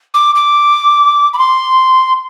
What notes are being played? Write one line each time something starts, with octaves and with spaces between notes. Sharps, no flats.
D6
D6
B5
C6